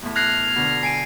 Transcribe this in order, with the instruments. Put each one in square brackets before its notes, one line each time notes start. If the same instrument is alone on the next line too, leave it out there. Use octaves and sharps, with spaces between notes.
[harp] E2 A2
[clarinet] F6 [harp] F#6 [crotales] G#6 A#6 C7
[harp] B2 D3
[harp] G#5 [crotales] C7 D7 D#7